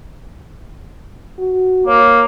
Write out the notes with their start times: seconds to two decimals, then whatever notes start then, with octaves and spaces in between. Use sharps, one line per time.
1.39 F#4
1.87 A#3 C#5